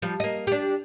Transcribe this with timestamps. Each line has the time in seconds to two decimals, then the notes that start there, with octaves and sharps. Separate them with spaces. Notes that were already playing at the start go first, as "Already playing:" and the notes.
0.02 F3 G3
0.20 A#3 D#5
0.47 D4 G4